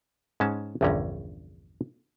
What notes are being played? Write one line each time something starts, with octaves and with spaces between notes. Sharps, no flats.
G#2 G#3 C#4 A5
A#1 E2 G2 D3 C#4 A#5